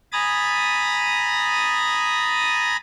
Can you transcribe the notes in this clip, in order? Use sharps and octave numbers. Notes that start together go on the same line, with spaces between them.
G#5 A#5 B5 D#6 A6